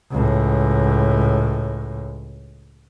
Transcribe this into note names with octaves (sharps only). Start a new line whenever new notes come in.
C#2 A2